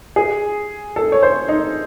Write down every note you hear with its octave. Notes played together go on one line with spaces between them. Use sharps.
G#4
A4
C#5
C5
D#4